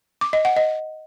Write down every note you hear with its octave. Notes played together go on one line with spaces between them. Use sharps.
D6
D#5
F#5
D#5